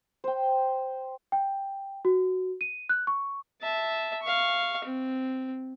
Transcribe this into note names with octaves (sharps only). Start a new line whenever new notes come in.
C5 G5
G5
F#4
D#7
F#6
C#6
E5 A5
F5 C#6
C4